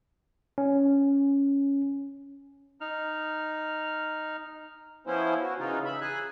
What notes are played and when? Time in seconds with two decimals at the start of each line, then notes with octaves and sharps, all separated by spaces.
0.58 C#4
2.81 D#4 F6
5.07 F3 B3 C#4 E4 C5
5.43 F#4
5.59 C#3 E3 D#4 F4
5.85 E5 B5
6.01 G#4 G#5 F#6